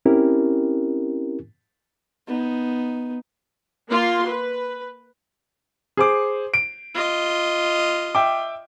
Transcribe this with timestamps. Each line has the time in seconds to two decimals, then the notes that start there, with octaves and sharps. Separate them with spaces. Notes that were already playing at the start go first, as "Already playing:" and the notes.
0.05 C4 C#4 E4 G4 A#4
2.27 B3 D#4
3.89 A#3 F4 C6
4.27 B4
5.97 G#4 C5 D6
6.54 D7
6.95 F4 D#5
8.15 E5 G5 D6